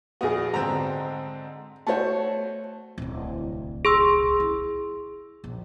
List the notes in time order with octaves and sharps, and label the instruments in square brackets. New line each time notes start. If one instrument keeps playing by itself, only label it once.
[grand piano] A#1 B3 [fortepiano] F#4 G#4
[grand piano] G#2 D3 C4 [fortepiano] A#5
[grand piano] A3 F#4 C5 [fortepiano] C#5 A5
[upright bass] D1 C2
[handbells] G#4 C6 E6
[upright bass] E4
A#1